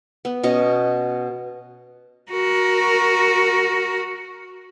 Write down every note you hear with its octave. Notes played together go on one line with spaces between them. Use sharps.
B3
B2 C#4 D#5 C#6
F#4 A#4